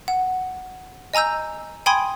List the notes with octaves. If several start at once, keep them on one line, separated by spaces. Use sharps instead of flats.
F#5
D#5 G#5 A#5 E6 G6
G5 G#5 B5 C6 D#6 G#6